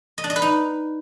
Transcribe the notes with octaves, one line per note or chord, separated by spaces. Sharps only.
D#5
D4
D#5
B4
D#4